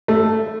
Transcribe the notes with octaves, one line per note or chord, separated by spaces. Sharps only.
A3